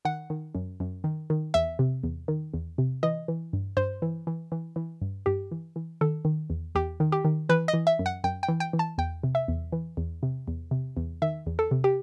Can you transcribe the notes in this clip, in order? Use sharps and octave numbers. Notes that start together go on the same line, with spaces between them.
D#3 F#5
D#3
F#2
F#2
D#3
D#3
E2 E5
C3
E2
D#3
E2
C3
E3 D#5
E3
G2
G2 C5
E3
E3
E3
E3
G2
G2 G4
E3
E3
D#3 A4
D#3
E2
E2 G4
D#3
G4
D#3
E3 B4
D#5
E3
E5
F#2
F#5
F#2 G5
G5
E3
G5
E3
A5
E2 G5
C3
E5
E2
E3
E2
C3
E2
C3
E2
D#3 E5
E2
A4
C3
G4